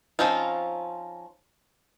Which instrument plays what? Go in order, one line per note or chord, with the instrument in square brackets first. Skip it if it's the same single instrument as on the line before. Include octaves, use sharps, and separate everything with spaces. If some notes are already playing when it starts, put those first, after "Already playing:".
[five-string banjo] F3 C4 C#4 D#4 F4